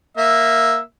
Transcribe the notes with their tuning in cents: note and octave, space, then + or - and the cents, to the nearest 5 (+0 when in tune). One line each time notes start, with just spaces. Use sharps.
A#3 +0 E5 +0